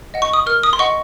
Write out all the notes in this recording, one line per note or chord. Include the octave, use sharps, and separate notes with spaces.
D#5 F#5
C#6
D#6
A#4 F6
D#6
C6
D#5 F#5 C#6